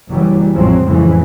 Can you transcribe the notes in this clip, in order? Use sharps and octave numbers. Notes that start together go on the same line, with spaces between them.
F#1 E3 F#3 G3
A1 F2 F3 F#3 G#3 C4
F2 A2 C#3 E3 G#3